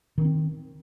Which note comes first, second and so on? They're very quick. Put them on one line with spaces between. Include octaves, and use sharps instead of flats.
D#3 D4 C4